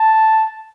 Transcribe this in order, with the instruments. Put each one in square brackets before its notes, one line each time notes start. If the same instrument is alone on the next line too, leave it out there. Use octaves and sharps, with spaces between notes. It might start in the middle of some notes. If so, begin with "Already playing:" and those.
Already playing: [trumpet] A5